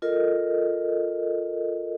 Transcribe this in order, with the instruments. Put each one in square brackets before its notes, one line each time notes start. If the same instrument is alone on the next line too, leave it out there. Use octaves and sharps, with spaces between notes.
[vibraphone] F4 A4 A#4 D#5